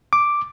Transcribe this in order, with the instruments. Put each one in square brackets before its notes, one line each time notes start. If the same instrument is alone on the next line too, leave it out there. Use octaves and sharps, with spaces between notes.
[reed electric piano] D6